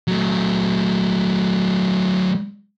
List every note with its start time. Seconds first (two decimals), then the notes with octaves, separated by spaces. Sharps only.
0.08 F#3 A3